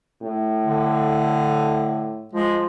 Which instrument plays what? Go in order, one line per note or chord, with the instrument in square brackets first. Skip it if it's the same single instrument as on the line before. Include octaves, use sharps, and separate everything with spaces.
[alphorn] A2
[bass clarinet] D3
[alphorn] F3 [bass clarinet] G#3